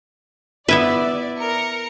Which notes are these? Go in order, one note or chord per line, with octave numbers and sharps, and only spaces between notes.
B3 E4 B4 D5 E5
A#4 C#7